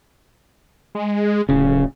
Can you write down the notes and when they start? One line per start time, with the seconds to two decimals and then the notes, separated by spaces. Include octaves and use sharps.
0.95 G#3
1.49 D1 C#3